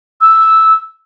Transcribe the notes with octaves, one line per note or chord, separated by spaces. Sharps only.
E6